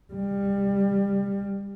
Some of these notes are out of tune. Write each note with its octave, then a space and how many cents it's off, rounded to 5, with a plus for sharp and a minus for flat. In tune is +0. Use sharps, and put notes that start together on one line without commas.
G3 +25